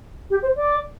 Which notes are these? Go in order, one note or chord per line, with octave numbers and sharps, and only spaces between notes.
G4
C5
D5